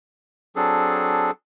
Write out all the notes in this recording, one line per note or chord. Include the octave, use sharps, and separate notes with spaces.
F#3 C4 D4 G#4 A4